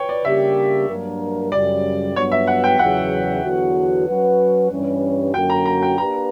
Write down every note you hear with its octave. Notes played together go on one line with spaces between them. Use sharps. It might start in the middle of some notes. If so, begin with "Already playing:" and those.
Already playing: B4 C#5 G5
D5
C#3 G3 A#3 D4 G4 E5
G2 F#3 A#3 D4 A#4
F#2 C#3 G3 D5
G2 F#3 B3 C#5
E5
F#5
G5
E2 C#3 F#3 F#5
E2 D3 F#3 B3 F#4
F#3 C#4 F#4 B4
G2 E3 G3 C#4
F#2 D3 A#3 C#4 F#4 G5
A#5
A#5
G5
A#3 D4 G4 B4 A#5